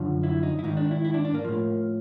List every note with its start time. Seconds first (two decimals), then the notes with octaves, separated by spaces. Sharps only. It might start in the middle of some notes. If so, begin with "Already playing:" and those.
Already playing: F#2 D3 F3
0.23 E4
0.43 D#4
0.59 E4
0.64 G#2 D#3 D#4
0.77 D4
0.91 E4
1.04 E4
1.14 D4
1.25 D4
1.34 A#3
1.44 A2 F3